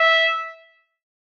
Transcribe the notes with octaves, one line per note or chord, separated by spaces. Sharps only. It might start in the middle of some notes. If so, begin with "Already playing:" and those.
Already playing: E5